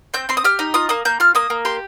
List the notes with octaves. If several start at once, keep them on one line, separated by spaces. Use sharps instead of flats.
C4 G6
C4 C6
D#6
G4 F6
D#4
F4 D#6
A#3 D#6
A#3 G6
F4 F6
A#3 D#6
A#3
G4 C6